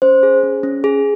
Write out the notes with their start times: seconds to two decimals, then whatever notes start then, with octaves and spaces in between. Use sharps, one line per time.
0.02 C#4 C5
0.23 G#4
0.43 C#4
0.63 C#4
0.84 G#4